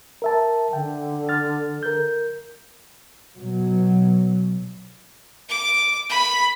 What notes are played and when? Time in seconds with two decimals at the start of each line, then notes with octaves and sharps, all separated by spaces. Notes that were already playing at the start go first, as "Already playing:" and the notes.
0.22 A#4 E5 A5
0.73 D3 G5
1.29 F6 A6
1.83 A#4 G6
3.36 B2 F#3
5.49 D6
6.10 B5